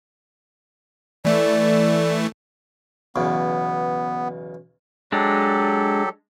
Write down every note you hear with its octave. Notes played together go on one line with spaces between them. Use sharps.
E3 A3 D5
B1 E2 C#3 B3
F#3 G#3 D4 G4 A4